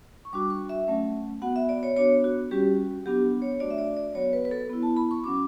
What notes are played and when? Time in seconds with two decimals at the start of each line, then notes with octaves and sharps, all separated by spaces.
0.25 C#6
0.33 G3 D4 F#4 D6
0.50 C#6
0.69 E5
0.87 F#3 A3 C#4
1.42 B3 F#4 F#5
1.56 E5
1.69 D5
1.83 C#5
1.96 B3 D4 F#4 C#5
2.24 F#4
2.51 G3 C#4 F#4 G4
3.06 F#3 B3 D4 G4
3.42 C#5
3.60 A3 D4 F#4 D5
3.71 E5
3.78 D5
3.97 D5
4.15 F#3 B3 F#4 C#5
4.33 B4
4.45 B4
4.51 A4
4.69 B3 E4
4.83 A5
4.97 B5
5.11 C#6
5.24 F#3 C#4 F#4 D6